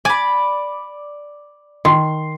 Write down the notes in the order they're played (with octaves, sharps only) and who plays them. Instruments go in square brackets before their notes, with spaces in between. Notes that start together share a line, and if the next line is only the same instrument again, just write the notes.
[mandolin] D5 B5 [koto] G#5
[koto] D#3 [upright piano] C6